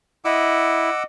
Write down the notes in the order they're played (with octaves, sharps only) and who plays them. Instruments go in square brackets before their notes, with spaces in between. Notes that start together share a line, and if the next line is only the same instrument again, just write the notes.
[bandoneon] E4 [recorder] D#5 [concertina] F#5 D6 E6